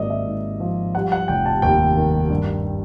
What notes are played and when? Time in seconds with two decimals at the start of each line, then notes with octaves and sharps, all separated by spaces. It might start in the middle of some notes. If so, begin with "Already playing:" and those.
Already playing: G#1 A#3 D5 D#5
0.10 E5
0.26 G#2
0.60 F3
0.95 G3 F#5
1.12 F#5
1.28 F1 G5
1.45 A5
1.62 D#2 G5
1.97 D#3
2.30 G2